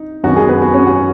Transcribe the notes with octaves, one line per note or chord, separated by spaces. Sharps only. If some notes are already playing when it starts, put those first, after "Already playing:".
Already playing: D#4
F#2 D#3 B3 F#4
G#3 G#4
B3 B4
F#4
C#4 C#5
F#4 F#5